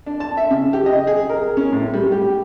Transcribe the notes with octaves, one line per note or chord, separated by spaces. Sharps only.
D4
A5
E5
C#3
G4
D#5
G#4
A#4
C#4
A2
G3
G4